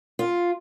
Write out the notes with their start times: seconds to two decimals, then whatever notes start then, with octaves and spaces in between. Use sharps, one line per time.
0.19 F4